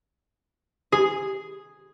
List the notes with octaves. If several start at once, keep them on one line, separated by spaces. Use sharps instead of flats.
G#4